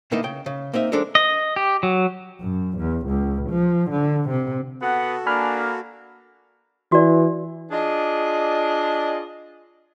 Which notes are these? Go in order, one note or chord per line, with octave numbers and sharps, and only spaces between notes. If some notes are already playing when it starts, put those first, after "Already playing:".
B2 D#3 A#3 D#4 E4
C#3 G5
C#3
A#3 C4 D#4 E5
F3 G#3 D4 A4 A#4
D#5
G4
F#3
F#2
E2
C#2
F3
D3
C3
B3 F#4 A4 F#5
A#3 D4 G#5 B5 F6
E3 F#4 D5
D4 F4 G#4 D5 D#5